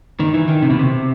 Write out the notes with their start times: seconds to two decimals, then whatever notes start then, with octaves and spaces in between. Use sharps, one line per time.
0.20 D#3
0.34 E3
0.48 D#3
0.62 C3
0.70 B2
0.79 C3